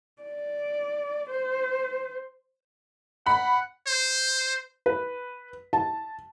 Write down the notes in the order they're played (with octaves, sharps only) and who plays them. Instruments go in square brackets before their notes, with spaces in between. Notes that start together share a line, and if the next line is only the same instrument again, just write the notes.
[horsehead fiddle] D5
C5
[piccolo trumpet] F#5 [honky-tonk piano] B5
[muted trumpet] C5
[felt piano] B4
A5